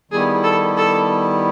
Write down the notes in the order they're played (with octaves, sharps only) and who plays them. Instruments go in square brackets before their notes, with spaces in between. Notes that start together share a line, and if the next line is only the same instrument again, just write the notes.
[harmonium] D#3 G3 B3 E4 G4 [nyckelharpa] G#4
[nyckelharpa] A4
A4